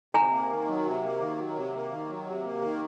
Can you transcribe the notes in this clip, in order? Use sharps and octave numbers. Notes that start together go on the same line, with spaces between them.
C3 G#5 A#5
A#3
D#3
F#3
C3
A#3
D#3
F#3
C3
A#3
D#3
F#3
C3
A#3
D#3